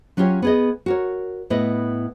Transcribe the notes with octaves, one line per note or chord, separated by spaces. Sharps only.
F#3 C#4 F4 G4 C#5
B3 G#4 D#5
F#4 A#4 C#5
A2 B3 B4 D#5